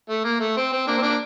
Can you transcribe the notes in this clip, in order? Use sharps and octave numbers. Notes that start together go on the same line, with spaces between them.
A3
A#3
A3
C4
C4
A#3 D4
C4
A#3 D4